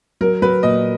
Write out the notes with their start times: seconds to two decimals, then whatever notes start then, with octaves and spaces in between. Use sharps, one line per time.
0.21 F#3 A#4
0.42 F#3 B4
0.63 A#2 D#5